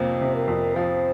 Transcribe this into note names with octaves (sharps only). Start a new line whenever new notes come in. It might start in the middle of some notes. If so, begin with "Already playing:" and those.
Already playing: F2 C3 F3 A#3 C5
C3
A#4
F2
F3 C5